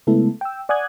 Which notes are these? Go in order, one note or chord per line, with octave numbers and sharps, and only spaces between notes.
C#3 G#3 A3 B3 E4 A4
G5 E6
D5 F#5 G#5 D#6 F#6 G#6